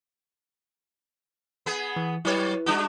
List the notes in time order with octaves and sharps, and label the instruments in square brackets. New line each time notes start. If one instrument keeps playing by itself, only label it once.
[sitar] B3 G#4
[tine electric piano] E3
[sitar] F#3 C#5 [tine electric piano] E4 B4
[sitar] G3 D4 F#4